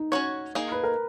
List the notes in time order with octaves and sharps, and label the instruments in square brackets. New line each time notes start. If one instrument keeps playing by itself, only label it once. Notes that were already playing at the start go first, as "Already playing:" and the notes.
Already playing: [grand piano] D#4
[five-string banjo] C#4 F#4 C#5
A#3 D#4 G#4
[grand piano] B4
A#4